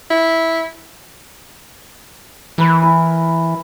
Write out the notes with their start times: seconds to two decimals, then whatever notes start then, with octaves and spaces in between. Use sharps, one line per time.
0.11 E4
2.58 E3 A#4 B4
2.82 E4 A#4